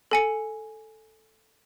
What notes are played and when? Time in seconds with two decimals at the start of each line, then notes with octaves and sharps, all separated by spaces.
0.11 A4 G#5 C#7